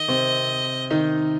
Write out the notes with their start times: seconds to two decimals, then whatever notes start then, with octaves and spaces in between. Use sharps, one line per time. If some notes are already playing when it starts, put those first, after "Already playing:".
Already playing: D#3 D#5
0.08 C3 C4
0.90 D#3 D#4